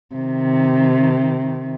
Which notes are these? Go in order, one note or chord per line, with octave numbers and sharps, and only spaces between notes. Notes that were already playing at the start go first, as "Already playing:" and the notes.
C3 D#3